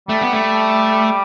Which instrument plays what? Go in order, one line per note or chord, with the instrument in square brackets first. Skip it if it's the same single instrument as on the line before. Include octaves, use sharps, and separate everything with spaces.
[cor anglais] G3 [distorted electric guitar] A3
[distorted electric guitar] B3
A3